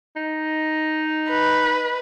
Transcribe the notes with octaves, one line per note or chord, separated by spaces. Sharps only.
D#4
B4